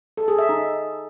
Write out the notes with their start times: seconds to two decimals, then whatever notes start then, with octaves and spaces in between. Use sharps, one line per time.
0.17 A4
0.28 G#4
0.39 E5
0.49 D#4